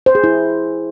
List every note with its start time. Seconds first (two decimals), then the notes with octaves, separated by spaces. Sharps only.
0.06 C5
0.15 G#4
0.24 E4